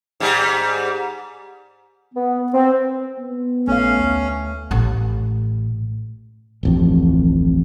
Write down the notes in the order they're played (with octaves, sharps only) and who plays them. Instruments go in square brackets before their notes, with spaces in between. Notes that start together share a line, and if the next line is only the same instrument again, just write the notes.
[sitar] G#2 G3
[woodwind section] B3
C4
[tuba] B3
[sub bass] A#1 [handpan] A3 F5 [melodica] C#4
[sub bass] D2
[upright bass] A1 A3
[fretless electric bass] D1 A1 F2